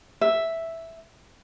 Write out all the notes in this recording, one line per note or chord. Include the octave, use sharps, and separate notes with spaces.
E5